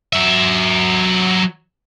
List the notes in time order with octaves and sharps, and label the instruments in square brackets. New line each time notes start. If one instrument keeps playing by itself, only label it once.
[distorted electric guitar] F#3 E5